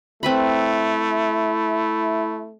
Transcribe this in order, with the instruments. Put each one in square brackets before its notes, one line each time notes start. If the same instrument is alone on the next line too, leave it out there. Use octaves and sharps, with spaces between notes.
[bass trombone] A3 [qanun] C4 B4 B5 [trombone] E4